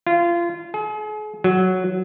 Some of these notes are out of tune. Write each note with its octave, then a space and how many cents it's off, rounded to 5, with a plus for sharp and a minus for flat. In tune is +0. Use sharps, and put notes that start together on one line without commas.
F4 -25
G#4 +40
F#3 +5